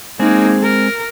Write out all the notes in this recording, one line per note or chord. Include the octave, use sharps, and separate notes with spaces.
G#3 A#3 C4 D#4 G#4
A#4